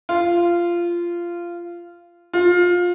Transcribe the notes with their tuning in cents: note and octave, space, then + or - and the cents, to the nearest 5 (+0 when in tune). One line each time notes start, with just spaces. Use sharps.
F4 -15
F4 +20